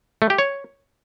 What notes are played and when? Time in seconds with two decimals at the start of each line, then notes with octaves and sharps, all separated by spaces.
0.22 A3
0.30 G4
0.38 C#5